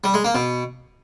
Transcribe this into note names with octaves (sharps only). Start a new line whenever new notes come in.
G3
G#3
A#3
B2